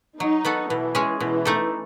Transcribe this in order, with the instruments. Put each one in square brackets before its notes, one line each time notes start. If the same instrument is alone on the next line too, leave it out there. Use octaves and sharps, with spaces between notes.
[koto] F#3 [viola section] D#4
[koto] B3 F#4 A4
[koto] B2 [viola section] E3
[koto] G#3 C#4 G#4
[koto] B2 [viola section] E3
[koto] A3 D#4 A4